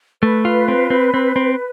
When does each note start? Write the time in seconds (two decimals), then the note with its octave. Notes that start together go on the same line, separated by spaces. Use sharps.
0.23 A3 B4
0.45 F4
0.68 C4
0.90 C4
1.14 C4
1.36 C4